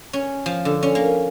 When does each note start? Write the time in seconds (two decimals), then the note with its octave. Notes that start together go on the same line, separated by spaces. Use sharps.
0.13 C#4
0.46 F3
0.65 D3
0.83 C#4
0.95 A#3